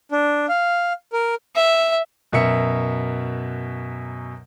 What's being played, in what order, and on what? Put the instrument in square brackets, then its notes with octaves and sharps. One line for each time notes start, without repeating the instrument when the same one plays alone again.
[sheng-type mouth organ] D4
F5
A#4
[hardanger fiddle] E5
[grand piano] F#2 B2 A#4 E5 C#7